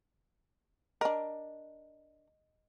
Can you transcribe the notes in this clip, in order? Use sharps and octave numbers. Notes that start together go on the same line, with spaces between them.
D4 A#4 D#5